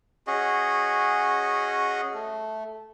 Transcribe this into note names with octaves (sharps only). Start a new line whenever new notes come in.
C#4 F#4 G#4 D#5
A3